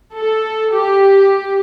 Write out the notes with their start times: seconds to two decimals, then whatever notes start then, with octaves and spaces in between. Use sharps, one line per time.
0.17 A4
0.75 G4